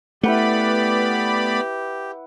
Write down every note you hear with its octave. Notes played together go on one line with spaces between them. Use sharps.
A3 B3 E4 G4 B4 D5 F#5 B5